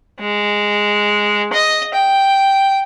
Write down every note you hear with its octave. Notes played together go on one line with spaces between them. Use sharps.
G#3
D#5
G5